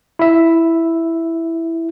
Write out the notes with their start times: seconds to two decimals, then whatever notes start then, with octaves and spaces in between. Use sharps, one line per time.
0.19 E4 E5